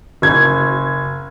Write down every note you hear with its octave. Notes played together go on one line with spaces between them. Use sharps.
F#1 G#6